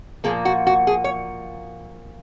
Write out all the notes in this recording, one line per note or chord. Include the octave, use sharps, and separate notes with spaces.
A#2 F3 A#3 G#4
F#4
F#4
G#4
C#5